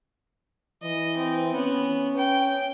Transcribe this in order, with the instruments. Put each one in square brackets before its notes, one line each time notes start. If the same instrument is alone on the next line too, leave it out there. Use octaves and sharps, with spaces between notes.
[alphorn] E3 [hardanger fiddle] D#5
[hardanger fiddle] C4
[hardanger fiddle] B3 [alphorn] C#4
[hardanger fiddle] G5